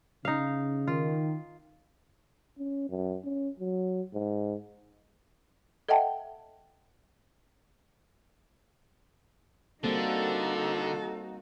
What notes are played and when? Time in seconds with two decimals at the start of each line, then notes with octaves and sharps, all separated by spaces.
0.25 C#3 D#4 F5
0.87 D#3 F4
2.59 C#4
2.90 F#2
3.24 C#4
3.59 F#3
4.14 G#2
5.89 A4 D#5 E5 F#5 G5 A5
9.84 D3 G3 A#3 C4 D#4 F#4 A4